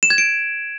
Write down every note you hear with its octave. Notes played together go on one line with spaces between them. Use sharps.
E7
G#6
D7